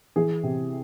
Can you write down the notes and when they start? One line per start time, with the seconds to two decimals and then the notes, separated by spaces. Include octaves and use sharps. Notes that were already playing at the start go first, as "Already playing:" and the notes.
0.16 E3 G#4
0.43 C3